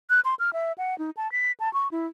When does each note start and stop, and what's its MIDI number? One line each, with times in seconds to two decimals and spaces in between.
0.10 0.20 90
0.25 0.35 84
0.39 0.53 89
0.53 0.72 76
0.78 0.98 78
0.99 1.10 63
1.17 1.30 81
1.32 1.52 95
1.60 1.72 81
1.74 1.88 85
1.91 2.07 64